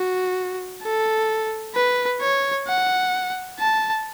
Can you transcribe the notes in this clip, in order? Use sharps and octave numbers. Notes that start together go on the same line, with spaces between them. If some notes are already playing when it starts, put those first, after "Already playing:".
Already playing: F#4
A4
B4
C#5
F#5
A5